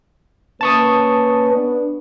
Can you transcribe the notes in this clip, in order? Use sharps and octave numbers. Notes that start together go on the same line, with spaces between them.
A#3 C#4 B4 A5 C#6 D#6
B3 D4